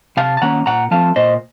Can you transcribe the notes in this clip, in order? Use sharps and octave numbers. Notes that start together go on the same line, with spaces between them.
C3 F5 A5
A5
D#3 A#3 C#4 F#5 A#5
A#2 F#5 A#5
F3 A3 C4 F5 A5
A#2 C5 D#5